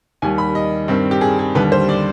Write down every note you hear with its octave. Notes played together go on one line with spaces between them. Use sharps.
D#2 D#3 G3 G#5
B5
D#5
G2 D#3 G3 C4
G4
G#4
G#4
D#2 D3 G3 B4
C5
D5